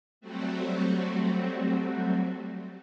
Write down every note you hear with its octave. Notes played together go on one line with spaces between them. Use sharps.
F#3 G3 A3 C4 F#4